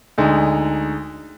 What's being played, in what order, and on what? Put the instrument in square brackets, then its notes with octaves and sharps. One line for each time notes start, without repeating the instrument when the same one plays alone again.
[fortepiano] D2 G#3 D#4